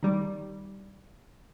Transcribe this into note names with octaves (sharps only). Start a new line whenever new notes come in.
D#3 G3